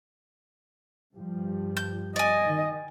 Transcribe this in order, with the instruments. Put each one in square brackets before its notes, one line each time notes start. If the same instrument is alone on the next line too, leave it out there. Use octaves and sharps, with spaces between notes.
[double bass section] G2 F3 G3
[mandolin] G6
[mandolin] D5 G#5 [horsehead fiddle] D#5
[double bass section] D#3